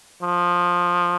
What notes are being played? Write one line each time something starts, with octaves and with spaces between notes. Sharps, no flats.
F3